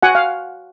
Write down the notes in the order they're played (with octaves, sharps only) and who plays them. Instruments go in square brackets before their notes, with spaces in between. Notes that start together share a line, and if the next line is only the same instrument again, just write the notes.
[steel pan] F#4 F#5 G#5
F5